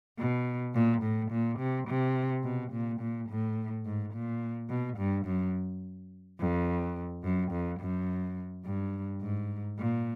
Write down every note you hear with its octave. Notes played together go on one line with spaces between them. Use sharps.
B2
A#2
A2
A#2
C3
C3
B2
A#2
A#2
A2
G#2
A#2
B2
G2
F#2
F2
F#2
F2
F#2
G2
G#2
A#2